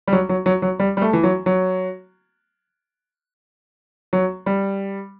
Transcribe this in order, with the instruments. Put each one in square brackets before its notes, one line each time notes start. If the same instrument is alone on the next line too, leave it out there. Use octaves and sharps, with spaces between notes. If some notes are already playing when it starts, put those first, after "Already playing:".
[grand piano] G3
F#3
F#3
F#3
F#3
G3
G3
A3
E3
F#3
F#3
F#3
G3